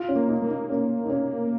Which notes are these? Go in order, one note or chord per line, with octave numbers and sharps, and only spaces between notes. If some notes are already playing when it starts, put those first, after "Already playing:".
Already playing: F4
C#4
A#3
D#4
A#3
D#4
A#3 C#4
D#4
C#4